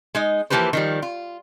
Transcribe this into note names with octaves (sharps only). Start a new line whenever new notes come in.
G#3 D#4 D#5
E3 F3 A#3 G4 B4 C5
D#3 F3 G3
F4